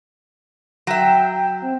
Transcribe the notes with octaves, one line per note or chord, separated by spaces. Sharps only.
F#3 E5 G5
C4